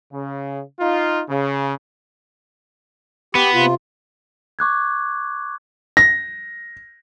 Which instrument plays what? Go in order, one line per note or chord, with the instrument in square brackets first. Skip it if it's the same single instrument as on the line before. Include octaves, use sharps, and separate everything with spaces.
[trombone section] C#3
D#4 F4
C#3
[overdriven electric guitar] B3 [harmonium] G4
[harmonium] C3 F4
[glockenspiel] C#6 D6 F#6 G#6
[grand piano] A#6